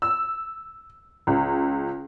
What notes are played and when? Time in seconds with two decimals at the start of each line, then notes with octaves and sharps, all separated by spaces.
0.02 E6
1.27 C#2